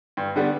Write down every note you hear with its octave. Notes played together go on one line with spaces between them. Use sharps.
G2
D3 G3 B3